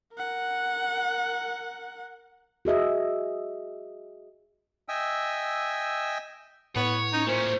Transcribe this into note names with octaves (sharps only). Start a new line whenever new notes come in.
A#4 F#5
F#4 G#4 D#5 E5
D#5 E5 G5 G#5 E6
A2 B3 C#5
C#4 D#4
A#2 A3 C#4 C5